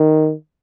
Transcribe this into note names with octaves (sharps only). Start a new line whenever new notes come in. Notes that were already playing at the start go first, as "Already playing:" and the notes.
Already playing: D#3